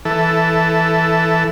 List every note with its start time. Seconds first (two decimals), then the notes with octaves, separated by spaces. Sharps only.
0.05 E3 A4